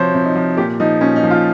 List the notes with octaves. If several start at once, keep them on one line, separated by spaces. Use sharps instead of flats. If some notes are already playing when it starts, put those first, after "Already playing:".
Already playing: C3 F3 C5 C#5
C3
D#4
F3
A#2 G4
F3 D#4
A#2 C#4
D#4
F3
F4